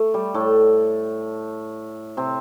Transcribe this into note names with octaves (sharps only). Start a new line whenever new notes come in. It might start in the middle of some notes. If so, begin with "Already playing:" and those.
Already playing: A3
G3
A2 A3
C3 C4